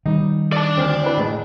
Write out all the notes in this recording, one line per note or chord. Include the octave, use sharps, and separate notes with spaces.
D#3 G3 D#4
D5 A5
D2 C4 F6
C4 E4 B4
A1 G#3